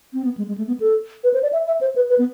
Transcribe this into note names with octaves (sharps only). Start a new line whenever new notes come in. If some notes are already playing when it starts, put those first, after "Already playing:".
C4
B3
G#3
G#3
A3
B3
A4
B4
C5
D5
E5
E5
C5
B4
B4
B3